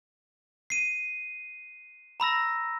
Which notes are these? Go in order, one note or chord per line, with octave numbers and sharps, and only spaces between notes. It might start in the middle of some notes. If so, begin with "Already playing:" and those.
C7 D#7
A#5 B5 E6 A#6